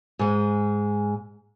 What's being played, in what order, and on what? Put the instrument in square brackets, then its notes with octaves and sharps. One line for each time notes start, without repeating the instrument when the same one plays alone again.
[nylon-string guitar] G#2 G#3